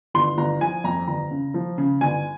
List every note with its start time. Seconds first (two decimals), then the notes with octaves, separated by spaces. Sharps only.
0.14 G1 C6
0.37 G1 A#5
0.61 F3 G#5
0.84 F2 A#5
1.07 G1 A#5
1.31 C#3
1.54 F3
1.78 C#3
2.01 G1 G#5